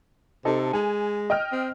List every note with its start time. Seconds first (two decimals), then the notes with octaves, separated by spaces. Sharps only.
0.45 C3 D#4 A4
0.73 G#3 G#5
1.30 D#5 G5 F6
1.52 C4